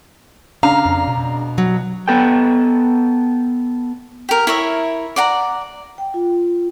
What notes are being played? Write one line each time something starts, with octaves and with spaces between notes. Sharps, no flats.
C#3 D4 F5 A#5
F2
B2
F#3
B3 A4 G5
G4 A#4
E4 A#4 C#5 E5
D5 F#5 A#5
G5
F4